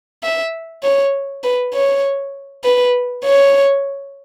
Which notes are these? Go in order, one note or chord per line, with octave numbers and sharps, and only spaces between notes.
E5
C#5
B4
C#5
B4
C#5